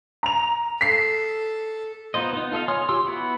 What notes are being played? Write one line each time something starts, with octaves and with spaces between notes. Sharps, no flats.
A#5 F7
A4 B6 C7
B3 D#4 F4 C5 D#5
B3 D#4
F4 A4 D#5 F5
C#5 G#5 C6 D#6 F6
F4 G4 C6 E6
B3 E4 F#4